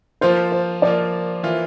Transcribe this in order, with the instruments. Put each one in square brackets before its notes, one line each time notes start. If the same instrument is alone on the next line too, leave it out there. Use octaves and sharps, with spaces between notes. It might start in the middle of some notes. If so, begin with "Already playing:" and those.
[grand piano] F3 A#3 F4 [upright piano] C5
[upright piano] C5
[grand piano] F3 A#3 F4 [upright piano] D5
[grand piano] E3 A#3 F4